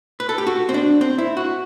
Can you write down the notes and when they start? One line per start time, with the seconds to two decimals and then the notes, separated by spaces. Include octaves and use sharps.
0.20 B4
0.29 A4
0.38 G4
0.47 F#4
0.69 C4
0.74 D4
1.01 C4
1.18 E4
1.37 F#4